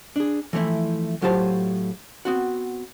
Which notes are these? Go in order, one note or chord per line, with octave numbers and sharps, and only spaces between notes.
D4 G#4
E3 F3 A3 E4
A2 F#3 F4 G4 C5 A5
B3 C4 F#4